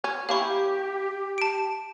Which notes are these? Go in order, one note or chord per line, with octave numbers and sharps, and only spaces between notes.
C#4
A#3 C#4 E4 G4 F5 C#6
A5 D7